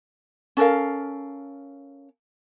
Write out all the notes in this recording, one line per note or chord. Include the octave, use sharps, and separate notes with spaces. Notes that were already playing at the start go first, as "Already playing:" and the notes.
C#4 A4 A#4 F5